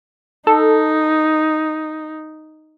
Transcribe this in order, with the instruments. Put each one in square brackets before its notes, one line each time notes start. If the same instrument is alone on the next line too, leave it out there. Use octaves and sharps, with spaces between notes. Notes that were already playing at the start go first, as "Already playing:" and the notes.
[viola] D#4 [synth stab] A4